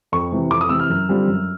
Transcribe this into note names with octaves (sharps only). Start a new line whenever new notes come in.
F2 C#6
C3 E3
F2 D6
D#6
C3 E3 E6
F6
F#2
D3 G3 C4 F4
F#2